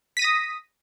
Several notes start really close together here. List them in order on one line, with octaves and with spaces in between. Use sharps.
B6 D#7 A#6 D#6